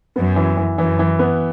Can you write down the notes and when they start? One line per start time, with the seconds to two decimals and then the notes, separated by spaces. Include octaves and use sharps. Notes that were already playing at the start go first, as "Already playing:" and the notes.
0.16 F#2 B3
0.36 E3
0.57 E3
0.77 F#2 E3
0.99 E3
1.19 B3